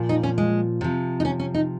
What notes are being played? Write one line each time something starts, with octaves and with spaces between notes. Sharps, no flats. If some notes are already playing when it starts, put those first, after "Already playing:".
Already playing: A#2 F3
D#4
C#4
G#3
C3 F3
D#4
C#4
C#4
D#4